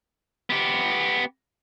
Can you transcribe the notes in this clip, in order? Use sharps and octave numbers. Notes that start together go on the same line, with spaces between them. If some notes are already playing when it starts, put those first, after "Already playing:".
B3 G4